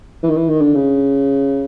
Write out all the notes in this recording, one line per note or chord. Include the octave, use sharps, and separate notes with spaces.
E3
D#3
E3
D#3
D3
C#3